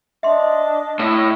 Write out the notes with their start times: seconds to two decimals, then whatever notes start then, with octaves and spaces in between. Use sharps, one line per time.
0.23 D4 D#5 E5 C6 D6
0.99 A2